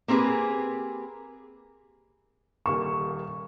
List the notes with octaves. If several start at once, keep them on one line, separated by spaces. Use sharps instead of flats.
A#3 C4 G4 G#4 B4
D#1 A#3 C#6 E7